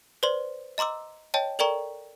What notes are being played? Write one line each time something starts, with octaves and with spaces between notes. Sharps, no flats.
B4 C5 D5 C6
D#5 A#5 C6 D6 E6
C#5 D#5 G5 A5
A4 A#4 D5 G5 A#5 C#6